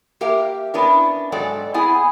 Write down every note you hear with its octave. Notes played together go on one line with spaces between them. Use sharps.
A#3 G4 A#4 E5 F5 G5
B3 C#4 D4 E4 A#4
G#2 F#3 G#3 A4 D5 G5
B3 C4 E4 G#4 G#5